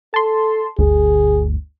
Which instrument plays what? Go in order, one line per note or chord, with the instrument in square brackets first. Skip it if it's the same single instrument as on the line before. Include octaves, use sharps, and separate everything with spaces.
[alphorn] A4 [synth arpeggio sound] A5 C6
[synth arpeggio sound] G1 D2 [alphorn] G#4